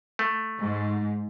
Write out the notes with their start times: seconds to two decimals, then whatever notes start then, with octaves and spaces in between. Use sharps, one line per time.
0.19 A3
0.59 G#2